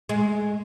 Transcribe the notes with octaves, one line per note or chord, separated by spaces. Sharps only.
G#3